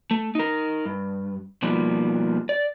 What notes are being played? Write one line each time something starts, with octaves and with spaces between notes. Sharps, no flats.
A3
D#4 A#4
G2
B2 D#3 F3 G3 A#3
D5